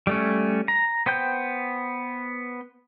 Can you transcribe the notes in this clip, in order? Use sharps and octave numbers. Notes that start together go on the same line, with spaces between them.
G3 A3 C#4
A#5
B3 C5 G5 G6